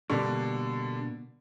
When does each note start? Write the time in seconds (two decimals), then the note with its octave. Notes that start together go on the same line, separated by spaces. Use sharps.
0.10 B2 D3 G3 A#3 D4